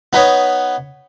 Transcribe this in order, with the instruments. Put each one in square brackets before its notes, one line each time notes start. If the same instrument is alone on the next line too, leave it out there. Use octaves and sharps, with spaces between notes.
[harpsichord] B3 D#4 B4 C#5